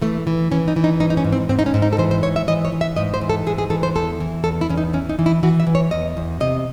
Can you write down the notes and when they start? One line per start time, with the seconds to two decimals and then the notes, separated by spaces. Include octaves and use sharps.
0.02 E3 A3
0.27 E3
0.52 E3 C#4
0.68 D#4
0.76 E3
0.84 D#4
1.00 G#2 D#4
1.10 D#4
1.17 C#4
1.24 G#2
1.32 C4
1.49 G#2 C4
1.59 D#4
1.66 C#4
1.74 G#2
1.82 D#4
1.93 A4
1.98 E3 C5
2.11 C5
2.23 G#2 C#5
2.36 E5
2.48 E3 D#5
2.65 C#5
2.72 E3
2.81 E5
2.96 G#2 D#5
3.14 C5
3.21 E3
3.30 A4
3.47 G#2 G#4
3.58 G#4
3.70 E3 A4
3.83 C5
3.95 E2 A4
4.20 E3
4.44 E2 A4
4.61 E4
4.69 E2 C#4
4.77 D#4
4.93 E3 C#4
5.09 D#4
5.19 E3
5.26 E4
5.43 E3 F#4
5.60 E5
5.67 E3
5.75 C#5
5.91 E2 D#5
6.17 E2
6.40 C3 D#5